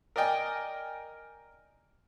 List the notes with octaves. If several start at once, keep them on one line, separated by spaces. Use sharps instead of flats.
A#4 D5 D#5 G5 G#5